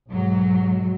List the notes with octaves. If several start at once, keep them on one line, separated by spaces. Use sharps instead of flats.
B1 G#2 F#3